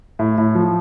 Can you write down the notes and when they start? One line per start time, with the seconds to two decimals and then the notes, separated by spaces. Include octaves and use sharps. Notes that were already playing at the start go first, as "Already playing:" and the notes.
0.19 A2
0.38 A2
0.55 F3